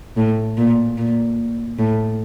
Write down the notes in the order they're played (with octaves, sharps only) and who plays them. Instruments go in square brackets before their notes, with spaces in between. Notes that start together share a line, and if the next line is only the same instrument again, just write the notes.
[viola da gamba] A2
A#2
A#2
A2